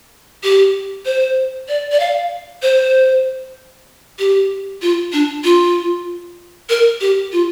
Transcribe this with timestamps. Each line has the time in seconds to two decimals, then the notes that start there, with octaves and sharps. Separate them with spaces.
0.43 G4
1.05 C5
1.69 D5
1.92 D5
2.00 F5
2.62 C5
4.19 G4
4.82 F4
5.13 D4
5.44 F4
6.69 A#4
7.01 G4
7.32 F4